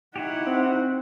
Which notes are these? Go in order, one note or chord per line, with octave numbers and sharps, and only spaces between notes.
D#4 E4 F#4 G4 F#5
C4